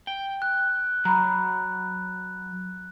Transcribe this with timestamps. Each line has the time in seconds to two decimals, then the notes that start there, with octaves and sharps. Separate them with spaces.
0.07 G5
0.42 F#6
1.05 F#3 A#5 B5